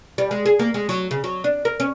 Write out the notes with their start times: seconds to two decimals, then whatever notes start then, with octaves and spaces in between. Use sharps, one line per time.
0.18 G3
0.31 G#3
0.46 G#4
0.59 A#3
0.74 G#3
0.89 F#3
1.11 C#3
1.24 F#3
1.44 D4
1.65 A#4
1.80 C#4